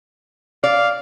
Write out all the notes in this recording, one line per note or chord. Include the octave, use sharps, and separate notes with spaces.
D5 F5